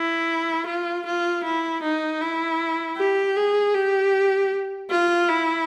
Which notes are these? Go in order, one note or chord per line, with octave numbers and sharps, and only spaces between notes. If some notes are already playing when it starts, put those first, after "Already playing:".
Already playing: E4
F4
F4
E4
D#4
E4
G4
G#4
G4
F4
E4